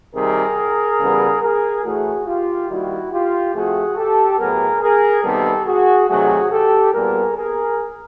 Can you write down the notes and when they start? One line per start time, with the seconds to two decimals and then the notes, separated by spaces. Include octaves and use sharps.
0.14 C3 D#3 G3 G#4 A#4
1.00 C#3 E3 G3 B3
1.41 G#4 A#4
1.84 A2 E3 A3 F#4 G#4
2.26 F4 G4
2.68 D#3 G3 A#3 E4 F#4
3.11 F4 G4
3.54 C3 F3 A3 F#4 G#4
3.96 G4 A4
4.38 A2 F#3 B3 G#4 A#4
4.81 G#4 A#4
5.23 C3 D#3 G3 B3 G4 A4
5.65 F#4 G#4
6.08 C3 D#3 F#3 A3 F#4 G#4
6.50 G4 A4
6.93 A#2 G3 B3 G#4 A#4
7.36 G#4 A#4